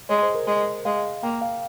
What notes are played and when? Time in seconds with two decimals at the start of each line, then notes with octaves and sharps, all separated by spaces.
0.09 G#3 C#5
0.23 C5
0.35 A#4
0.47 G#3
0.85 G#3 F5
1.23 A#3 G5
1.41 F5